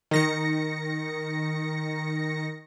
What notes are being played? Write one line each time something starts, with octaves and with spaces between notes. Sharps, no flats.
D#3 A#6 C#7